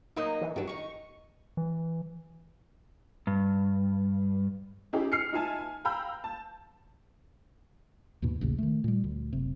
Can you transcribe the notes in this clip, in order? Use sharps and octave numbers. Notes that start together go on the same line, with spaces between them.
F#3 A#3 D#4 D#5
E3
G2 D#3 F#3
D#3 D#4 C#6
E3
G2
C#4 D#4 E4 G4 G#4
F6 C7 C#7
D#4 F4 E5 G#5 A5
G#5
F5 G5 A#5 B5 E6 G6
A5
D#2 G#2 B2
A1 D#2 C#3
D#3 A3
A#2 G3
D2
F#1 C3